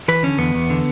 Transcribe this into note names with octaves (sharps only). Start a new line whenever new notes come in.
E3 B4
D3 C#4
E2 B3
E2
D3